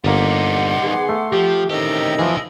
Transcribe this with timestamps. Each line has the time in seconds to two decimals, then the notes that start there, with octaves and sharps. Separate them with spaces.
0.04 G1 G3 A#3 D#4 F#5 C6 D6
0.82 D#3 B3 G#4
1.09 A3
1.33 F3 G4
1.70 A2 C3 D#3 C#4 G4 D#5 E6
2.19 E3 F3 E4 G#4